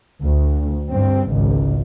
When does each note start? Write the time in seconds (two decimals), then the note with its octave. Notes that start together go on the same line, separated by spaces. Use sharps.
0.24 D2
0.90 G2 C4
1.31 G#1 C#2